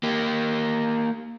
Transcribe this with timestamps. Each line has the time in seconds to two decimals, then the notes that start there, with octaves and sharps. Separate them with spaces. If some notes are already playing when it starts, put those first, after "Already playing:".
0.03 A#3 G4